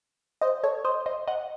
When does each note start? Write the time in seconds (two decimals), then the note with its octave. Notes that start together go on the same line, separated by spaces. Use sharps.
0.41 C5 D#5
0.63 A4 C#5
0.85 C5 D#5
1.06 C5 D#5
1.28 D#5 F#5